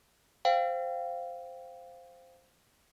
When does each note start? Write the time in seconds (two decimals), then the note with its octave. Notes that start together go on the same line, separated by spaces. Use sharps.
0.45 C5 F5 G5